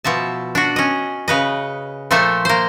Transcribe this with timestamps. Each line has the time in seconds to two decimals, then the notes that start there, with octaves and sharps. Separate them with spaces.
0.04 B2 F3 E5 A5
0.55 D4 F#4
0.76 C#4 D#5
1.28 C#3 B4 D#5
2.11 A#2 F3 A3 C5 E5
2.45 A#3 C5